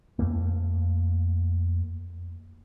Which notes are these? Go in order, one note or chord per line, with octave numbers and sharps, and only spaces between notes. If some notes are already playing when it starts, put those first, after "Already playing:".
F2 A3 A#3